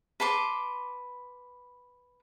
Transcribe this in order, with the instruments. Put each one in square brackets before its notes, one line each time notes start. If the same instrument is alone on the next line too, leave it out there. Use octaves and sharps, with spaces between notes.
[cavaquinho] B4 A5 C6 D6